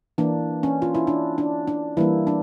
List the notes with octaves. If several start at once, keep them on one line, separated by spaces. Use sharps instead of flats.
E3 A#3 D4
C#4
F4
E4
D4
D4
D4
E3 G3 A#3 E4
D4